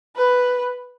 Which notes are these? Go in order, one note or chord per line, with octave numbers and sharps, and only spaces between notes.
B4